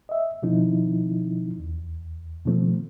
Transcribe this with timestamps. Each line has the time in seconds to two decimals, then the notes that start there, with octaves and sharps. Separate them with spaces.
0.09 D#5 E5
0.43 B2 D#3 F3 C4 D#4 E4
1.60 E2
2.46 B2 D#3 F3 A3 C4